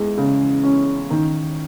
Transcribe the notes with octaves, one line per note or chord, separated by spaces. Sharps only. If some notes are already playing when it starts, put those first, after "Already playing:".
Already playing: E2 G#3
C#3
C#4
D#3